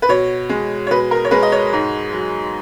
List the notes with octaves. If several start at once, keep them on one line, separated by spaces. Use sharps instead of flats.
B4
B2 C#5
G#3
C#5
B2 B4
A#4
C#5
G#3 B4
D#5
C#5
G#2
F#3